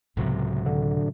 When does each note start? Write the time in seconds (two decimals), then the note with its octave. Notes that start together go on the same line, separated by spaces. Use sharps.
0.17 C#2 A2 C3 F#3
0.66 D3